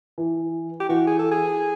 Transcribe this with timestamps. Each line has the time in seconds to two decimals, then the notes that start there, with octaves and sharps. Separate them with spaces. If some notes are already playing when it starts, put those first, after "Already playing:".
0.18 E3
0.80 G4
0.89 E3 F#4
1.07 G#4
1.19 A4
1.31 G#4